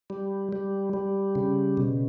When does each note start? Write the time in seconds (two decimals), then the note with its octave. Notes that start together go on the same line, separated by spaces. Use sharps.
0.10 G3
0.53 G3
0.93 G3
1.35 C#3
1.77 B2